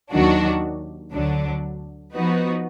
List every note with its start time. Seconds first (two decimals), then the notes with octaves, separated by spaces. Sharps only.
0.12 D#2 D#3 F#3 D4 F#4
1.12 D2 D3 F#3 D4
2.14 F3 B3 D#4 F#4 B4